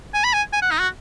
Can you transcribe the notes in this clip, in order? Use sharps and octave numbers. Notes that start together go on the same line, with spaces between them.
G#5
B5
G#5
G#5
F#5
D#4
F#4